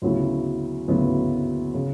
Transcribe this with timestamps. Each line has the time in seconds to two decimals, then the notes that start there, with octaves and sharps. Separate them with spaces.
0.02 D2 C#3 F#3 B3 E4
0.88 D2 C#3 F#3 B3 E4
1.74 C#3